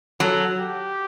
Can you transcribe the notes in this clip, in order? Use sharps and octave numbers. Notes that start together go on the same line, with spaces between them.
F#3 A4
G4